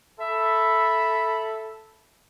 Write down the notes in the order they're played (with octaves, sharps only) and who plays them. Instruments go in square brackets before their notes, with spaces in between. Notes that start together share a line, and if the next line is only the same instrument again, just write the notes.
[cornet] A4 [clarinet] E5 [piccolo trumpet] B5